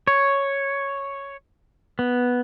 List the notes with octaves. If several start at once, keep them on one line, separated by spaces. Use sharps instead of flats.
C#5
B3